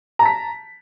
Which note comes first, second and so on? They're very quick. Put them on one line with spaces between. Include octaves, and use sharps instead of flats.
A#5 A5 B6